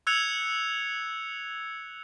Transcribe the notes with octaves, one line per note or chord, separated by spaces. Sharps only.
E6 F#6 G#6 C#7 F7